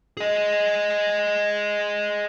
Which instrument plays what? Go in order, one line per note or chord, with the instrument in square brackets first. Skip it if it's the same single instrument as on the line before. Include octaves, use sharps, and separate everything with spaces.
[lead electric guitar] G#4 D#5